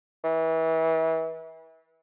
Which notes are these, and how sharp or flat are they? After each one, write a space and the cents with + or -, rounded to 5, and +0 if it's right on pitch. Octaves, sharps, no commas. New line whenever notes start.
E3 -30